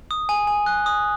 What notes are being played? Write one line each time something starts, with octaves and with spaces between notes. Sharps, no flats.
D#6
G#5
G#5
F#6
D#6